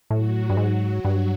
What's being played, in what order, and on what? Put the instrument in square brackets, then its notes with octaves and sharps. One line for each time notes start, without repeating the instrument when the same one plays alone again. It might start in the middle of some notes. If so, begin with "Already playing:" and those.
[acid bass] A2 [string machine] F#3 F#4
[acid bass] G2
G#2
G2